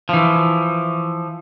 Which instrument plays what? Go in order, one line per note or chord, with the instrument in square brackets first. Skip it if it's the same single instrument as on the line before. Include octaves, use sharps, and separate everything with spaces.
[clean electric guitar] E3 F3